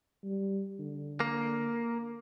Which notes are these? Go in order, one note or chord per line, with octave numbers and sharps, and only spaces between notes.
G3
D3
A#3